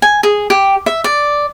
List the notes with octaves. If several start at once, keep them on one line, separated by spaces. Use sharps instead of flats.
G#5
G#4
G4
E5
D5